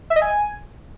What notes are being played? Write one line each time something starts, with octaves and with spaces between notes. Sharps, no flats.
E5
D#5
G#5